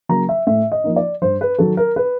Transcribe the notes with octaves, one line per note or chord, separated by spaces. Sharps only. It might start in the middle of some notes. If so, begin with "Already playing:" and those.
C#3 F#3 A#3 A#5
E5
A2 E5
D#5
F3 A#3 D#4
D5
G2 C5
B4
D#3 F#3 A4
A#4
B4